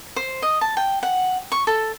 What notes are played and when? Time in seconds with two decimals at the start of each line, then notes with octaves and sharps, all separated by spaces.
0.16 C5
0.42 D#5
0.61 A5
0.77 G5
1.03 F#5
1.52 C#6
1.67 A4